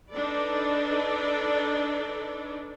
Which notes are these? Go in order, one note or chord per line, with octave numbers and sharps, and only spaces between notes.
D4 D#4 A4 B4 D5